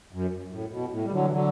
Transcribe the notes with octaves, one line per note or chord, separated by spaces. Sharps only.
F#2
A2
B2
A2
G3
D3 F#3
E3
D3 F#3